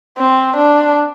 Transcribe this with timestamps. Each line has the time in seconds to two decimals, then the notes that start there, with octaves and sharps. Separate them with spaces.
0.18 C4
0.57 D4